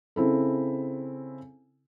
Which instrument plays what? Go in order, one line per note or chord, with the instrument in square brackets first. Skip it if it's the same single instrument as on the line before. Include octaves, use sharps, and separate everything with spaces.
[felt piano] C#3 C4 E4 A4